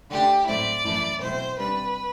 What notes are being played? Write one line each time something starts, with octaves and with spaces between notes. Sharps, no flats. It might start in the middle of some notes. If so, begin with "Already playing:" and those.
D3 A3 D4 G4
A2 F#3 A3 C4 E4 D5
F#2 E3 A3 E4
B2 F#3 A3 C4 E4 C5
C3 G3 D4 B4